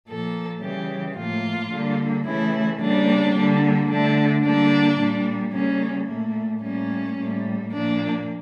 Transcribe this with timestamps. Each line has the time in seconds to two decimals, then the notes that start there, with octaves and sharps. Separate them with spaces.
0.08 A#2 F3 A#3 A4
0.63 C#3 E3 G3 G4
1.17 A2 F3 A#3 F4
1.73 D3 G3 A#3
2.26 C#3 E3 A3 E4
2.81 C#3 G3 A#3 D4
3.36 D3 G3 A#3
3.90 D3 A3 D4
4.44 D3 G3 A#3 D4
4.99 A#2 G3 A#3
5.53 C#3 G3 A#3 C#4
6.08 A3 A#3
6.13 A#2
6.62 A2 G3 A#3 C#4
7.17 A2 G3 A#3
7.72 A#2 F3 A#3 D4